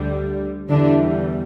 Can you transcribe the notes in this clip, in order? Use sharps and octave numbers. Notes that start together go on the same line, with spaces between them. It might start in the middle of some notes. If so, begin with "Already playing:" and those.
Already playing: D2 D3 G3
E2 D3 E3 G3 D4